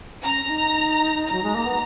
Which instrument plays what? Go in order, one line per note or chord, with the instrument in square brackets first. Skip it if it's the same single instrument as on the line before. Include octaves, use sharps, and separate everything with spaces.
[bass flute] C#4 [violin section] A#5
[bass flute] C#4
D#4
[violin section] A#5
[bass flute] F#3
G#3
A#3
B3